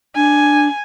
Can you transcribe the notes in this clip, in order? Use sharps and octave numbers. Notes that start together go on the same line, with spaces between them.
D4 G#5